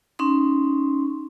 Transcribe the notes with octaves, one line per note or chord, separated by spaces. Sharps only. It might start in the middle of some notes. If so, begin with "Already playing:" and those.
C#4 D#4 C6